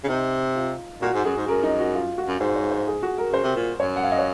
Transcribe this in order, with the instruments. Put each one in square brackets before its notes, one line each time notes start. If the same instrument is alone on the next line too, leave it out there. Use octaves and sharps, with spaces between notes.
[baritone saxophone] C#3
[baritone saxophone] C3 [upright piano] D#4
[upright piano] F4
[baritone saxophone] A#2 [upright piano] F#4
[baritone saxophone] G#2
[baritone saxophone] F#2 [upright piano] G#4
[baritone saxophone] G#2
[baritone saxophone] F#2 [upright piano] A#4
[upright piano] D#4
F#4
F4
F#4
[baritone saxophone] F#2
[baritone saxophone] G#2 [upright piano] C5
[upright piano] C#5
C5
G#4
F#4
A#4
[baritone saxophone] C#3 [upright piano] C5
[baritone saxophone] C3
A#2
[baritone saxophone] F#2 [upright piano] C#5
[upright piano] F#5
F5
D#5
C#5